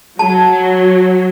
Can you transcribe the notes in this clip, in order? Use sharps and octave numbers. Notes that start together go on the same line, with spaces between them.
F#3 A5